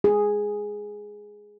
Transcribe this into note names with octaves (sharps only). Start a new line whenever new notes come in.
G#4